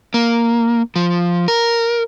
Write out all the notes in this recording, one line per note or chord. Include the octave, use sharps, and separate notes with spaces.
A#3
F3
A#4